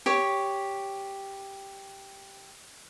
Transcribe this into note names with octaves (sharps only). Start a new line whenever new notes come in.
G4 C#5